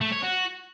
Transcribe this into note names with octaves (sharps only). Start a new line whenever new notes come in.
A3
C#5
F#4